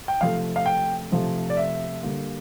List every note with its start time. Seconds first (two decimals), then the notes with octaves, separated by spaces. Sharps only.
0.08 G5
0.21 C3 F3 A3 F5
0.56 F5
0.66 G5
1.12 C3 F3 A3
1.50 D5
1.57 E5
2.03 D3 G3 A#3